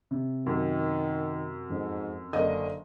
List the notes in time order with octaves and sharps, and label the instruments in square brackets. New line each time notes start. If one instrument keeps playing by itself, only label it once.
[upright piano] C3
[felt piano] F#2 [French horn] D#3
[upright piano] F2 [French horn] G#2
[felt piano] F#1 D#5 [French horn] D3 [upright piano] A#4 F5